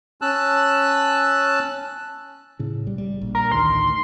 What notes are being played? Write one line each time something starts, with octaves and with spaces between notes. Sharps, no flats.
C#4 A5 E6 F#6
A2 C#3
B1 G3
G3
A#1
A#4
D2 A2 D#3 C6